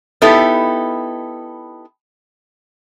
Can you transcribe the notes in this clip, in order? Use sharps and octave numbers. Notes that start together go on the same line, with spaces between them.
B3 D#4 E4 G4 A4